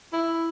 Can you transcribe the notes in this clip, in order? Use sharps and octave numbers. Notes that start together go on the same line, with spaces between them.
E4